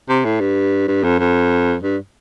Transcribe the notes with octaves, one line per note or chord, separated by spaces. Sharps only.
C3
A2
G2
G2
F2
F2
G2